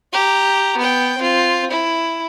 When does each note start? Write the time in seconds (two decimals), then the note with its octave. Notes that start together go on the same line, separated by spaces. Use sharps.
0.13 G4 A#5
0.77 B3 G5
1.18 C4 F4
1.71 E4